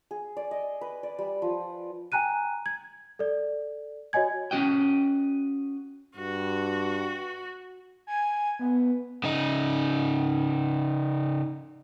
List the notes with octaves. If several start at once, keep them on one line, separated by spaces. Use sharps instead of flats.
G#4
D5
D#5
B4
D5
G3
F3
G5 G#5 A#5 F#6 D#7
G#6
A4 D5
F#4 C#5 D#5 G#5 G#6
C#4 F#4 D#5 G5
G2 F#4
G#5
B3
C#3 D#4